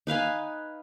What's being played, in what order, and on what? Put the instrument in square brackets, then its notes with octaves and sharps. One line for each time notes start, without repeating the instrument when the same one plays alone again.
[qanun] D#4 B4 F5 G#5